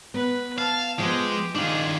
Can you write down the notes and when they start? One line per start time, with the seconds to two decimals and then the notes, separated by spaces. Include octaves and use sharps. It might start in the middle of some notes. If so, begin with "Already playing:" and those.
0.14 B3 B4
0.58 F5 A5
0.99 F3 G#3 B3 G4
1.56 D#3 D4 D#4 F4 G#4